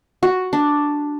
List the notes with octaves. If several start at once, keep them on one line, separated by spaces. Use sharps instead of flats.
F#4
D4